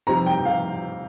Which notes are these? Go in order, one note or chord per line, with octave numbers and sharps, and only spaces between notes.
F2 C3 G3 C4 D#4 A#5
G5
F5